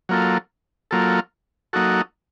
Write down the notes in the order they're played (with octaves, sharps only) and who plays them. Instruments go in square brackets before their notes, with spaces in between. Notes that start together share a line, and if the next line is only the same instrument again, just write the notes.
[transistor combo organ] F#3 A#3 F4 A4
F#3 A#3 F4 A4
F#3 A#3 D#4 F#4 A4